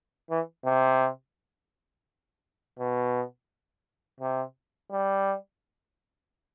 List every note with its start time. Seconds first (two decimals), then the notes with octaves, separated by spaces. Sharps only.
0.30 E3
0.65 C3
2.79 B2
4.21 C3
4.91 G3